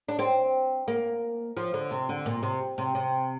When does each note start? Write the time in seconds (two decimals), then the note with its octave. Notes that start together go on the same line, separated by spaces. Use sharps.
0.09 D4
0.19 C4
0.88 A#3
1.57 F3
1.74 D3
1.91 C3
2.09 D3
2.26 A#2
2.43 C3
2.78 C3
2.95 C3